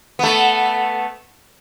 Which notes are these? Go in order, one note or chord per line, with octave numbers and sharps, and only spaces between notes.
A3 B3